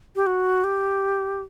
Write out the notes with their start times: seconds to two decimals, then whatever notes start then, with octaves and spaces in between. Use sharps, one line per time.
0.16 G4
0.27 F#4
0.64 G4